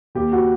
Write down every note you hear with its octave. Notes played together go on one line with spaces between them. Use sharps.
D#2 G4
F#4